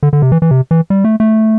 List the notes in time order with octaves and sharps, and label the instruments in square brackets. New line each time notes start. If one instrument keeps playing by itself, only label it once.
[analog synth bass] D3
D3
C3
E3
E3
C3
E3
G3
A3
A3